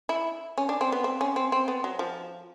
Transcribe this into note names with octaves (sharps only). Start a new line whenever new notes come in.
E4
C#4
D4
C4
B3
C4
C#4
C4
C4
B3
F#3
F3